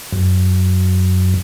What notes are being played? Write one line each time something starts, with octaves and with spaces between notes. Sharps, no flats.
F#2